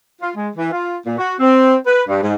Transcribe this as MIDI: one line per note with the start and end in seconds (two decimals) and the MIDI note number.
0.21 0.30 65
0.36 0.49 56
0.56 0.71 52
0.72 0.97 65
1.06 1.14 46
1.18 1.35 66
1.40 1.75 60
1.87 2.02 71
2.08 2.20 43
2.23 2.35 44